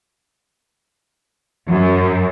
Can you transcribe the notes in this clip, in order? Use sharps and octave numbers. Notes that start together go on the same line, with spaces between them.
F#2